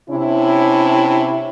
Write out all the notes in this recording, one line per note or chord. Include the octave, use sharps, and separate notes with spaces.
C3 C#4 D4 E4